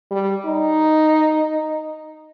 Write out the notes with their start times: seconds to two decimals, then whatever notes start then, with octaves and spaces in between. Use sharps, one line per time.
0.11 G3
0.46 D#4